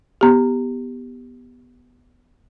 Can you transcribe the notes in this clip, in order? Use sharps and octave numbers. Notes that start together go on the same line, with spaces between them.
B3 G4